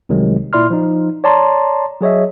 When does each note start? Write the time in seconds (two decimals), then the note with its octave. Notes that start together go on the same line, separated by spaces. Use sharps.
0.09 C2 C3 D#3 F#3 G#3
0.53 A#2 E4 D5 C6 F6
0.70 F3 D#4
1.24 C#5 D5 A5 A#5 C6
2.01 F#3 G#4 C#5 D#5 E5